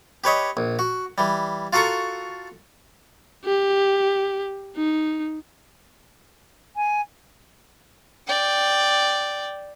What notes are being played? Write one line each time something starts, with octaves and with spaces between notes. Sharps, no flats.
G4 B4 C#5 D#5
A#1
F#4
E3 G3
F4 F#4 A4 A#4 A#5 C#6
G4
D#4
G#5
D5 G5